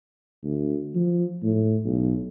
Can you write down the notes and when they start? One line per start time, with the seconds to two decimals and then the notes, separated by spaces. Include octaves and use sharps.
0.43 D2
0.95 F3
1.43 A2
1.85 B1